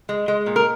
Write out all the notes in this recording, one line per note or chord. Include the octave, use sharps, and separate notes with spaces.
G#3
G#3
A#2
A#4